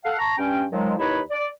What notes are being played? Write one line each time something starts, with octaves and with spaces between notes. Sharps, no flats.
A4 F5 F#5
A5 A#5 C#6
G2 C#4 G5
D#3 F3 F#3 G#3
D#2 D#4 E4 B4 C#5 B5
D5